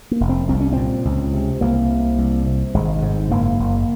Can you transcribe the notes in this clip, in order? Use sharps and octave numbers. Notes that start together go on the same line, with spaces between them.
A#3
F1
C4
C2 C4
C#4
A#2 C4
C#2
C3
C2 A#3
C3
C2
C3
G#1 G#3
G#2
F#1 A#3
F#1